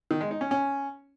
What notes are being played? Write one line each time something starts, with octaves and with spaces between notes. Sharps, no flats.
D#3
G#3
D#4
C#4
C#4